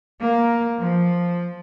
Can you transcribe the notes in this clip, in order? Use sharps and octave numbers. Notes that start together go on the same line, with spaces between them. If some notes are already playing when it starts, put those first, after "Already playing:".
A#3
F3